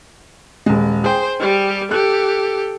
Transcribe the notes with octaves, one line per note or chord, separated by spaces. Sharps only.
D#1 G#3
G#4 C5 G5
G3 G4
G4 A4 F#6